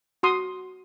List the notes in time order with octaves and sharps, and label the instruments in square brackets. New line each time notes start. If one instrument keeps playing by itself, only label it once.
[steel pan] F#4 C6 D#6